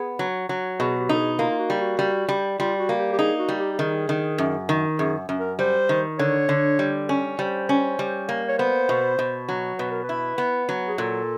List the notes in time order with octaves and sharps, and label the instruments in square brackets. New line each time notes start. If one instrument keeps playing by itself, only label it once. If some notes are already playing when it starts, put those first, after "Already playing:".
Already playing: [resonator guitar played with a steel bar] B3 [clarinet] G#4
[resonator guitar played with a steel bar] F#3
F#3
[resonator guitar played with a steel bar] B2 [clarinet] G#4
[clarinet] G4
[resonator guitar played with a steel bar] D#4 [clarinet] A4
[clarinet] G#4
[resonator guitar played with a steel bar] A#3 [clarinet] F4
[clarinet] F4
F#4
[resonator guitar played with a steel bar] G3
[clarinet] F#4
[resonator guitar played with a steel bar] G3
G3
[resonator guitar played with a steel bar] G3 [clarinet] F4
[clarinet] F#4
[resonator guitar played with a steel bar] A#3
[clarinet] G4
G4
[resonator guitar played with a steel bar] D#4 [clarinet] G#4
[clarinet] F#4
[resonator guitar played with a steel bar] G3
[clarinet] G4
G4
[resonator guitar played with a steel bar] D#3 [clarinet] G#4
[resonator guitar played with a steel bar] D#3
F#2
D#3
[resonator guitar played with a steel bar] F#2 [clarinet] G#4
[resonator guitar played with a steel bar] F#2
[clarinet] A#4
[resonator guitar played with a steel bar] G3 [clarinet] C5
[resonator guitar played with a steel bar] D#3
[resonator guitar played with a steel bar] D3 [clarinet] C#5
[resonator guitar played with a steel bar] D3
G3
C#4
[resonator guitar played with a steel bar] G3 [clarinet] C5
[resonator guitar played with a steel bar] C#4
G3
A#3
[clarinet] C#5
[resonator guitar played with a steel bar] B3 [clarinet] C5
[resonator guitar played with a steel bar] B2
B2
F#3
[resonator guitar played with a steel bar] B2 [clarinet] B4
[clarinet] A#4
B4
[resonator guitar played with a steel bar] E4
B3
F#3
[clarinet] G#4
[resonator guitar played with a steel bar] A#2 [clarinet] A4